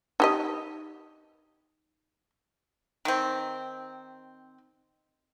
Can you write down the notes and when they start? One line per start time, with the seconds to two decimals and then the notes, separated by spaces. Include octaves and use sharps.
0.20 D#4 G4 D#5
3.05 D#3 C4